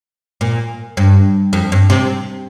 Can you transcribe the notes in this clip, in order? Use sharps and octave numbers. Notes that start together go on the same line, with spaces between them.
A#2
G2
F2
G2
C3